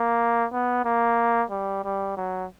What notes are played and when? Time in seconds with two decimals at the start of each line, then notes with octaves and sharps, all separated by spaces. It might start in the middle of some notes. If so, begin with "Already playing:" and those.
Already playing: A#3
0.53 B3
0.85 A#3
1.51 G3
1.84 G3
2.17 F#3